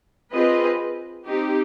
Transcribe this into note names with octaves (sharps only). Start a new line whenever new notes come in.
C4 F4 G#4 B4 D#5
C4 D#4 G4